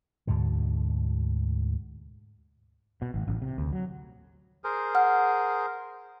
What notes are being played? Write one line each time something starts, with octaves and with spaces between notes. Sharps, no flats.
D2 G#2 B2 D3
B2
G#1
A1
C3
D2
F#3
G#4 A#4 C5
F#5 F6